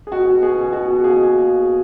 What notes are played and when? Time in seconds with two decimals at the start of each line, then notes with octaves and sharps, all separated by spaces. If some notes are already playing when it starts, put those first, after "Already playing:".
0.07 G#4
0.12 B2 F#4
0.42 B2 G#4
0.73 B2 F#4
1.04 A#3 G#4